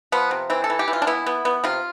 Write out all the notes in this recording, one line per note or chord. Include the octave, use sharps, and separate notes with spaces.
F3 B3
C3
E3 C4
A4
E3
G4
E3
F4
D4
B3 E4
B3
B3
C3 F4